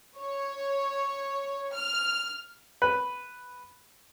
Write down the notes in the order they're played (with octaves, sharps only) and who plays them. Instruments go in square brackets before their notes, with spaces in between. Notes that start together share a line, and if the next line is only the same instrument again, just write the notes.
[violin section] C#5
F6
[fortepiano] B4